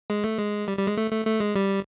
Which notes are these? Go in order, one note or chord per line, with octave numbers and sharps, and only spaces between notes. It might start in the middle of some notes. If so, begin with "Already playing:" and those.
G#3
A3
G#3
G3
G3
G#3
A3
A3
A3
G#3
G3